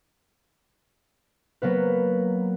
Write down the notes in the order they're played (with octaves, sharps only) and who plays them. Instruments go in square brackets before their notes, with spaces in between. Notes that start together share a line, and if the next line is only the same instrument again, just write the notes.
[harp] F#3 A#3 B3 B4